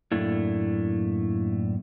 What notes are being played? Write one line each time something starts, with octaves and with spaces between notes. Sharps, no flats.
F#2 A2 A3 A#3 D4 E4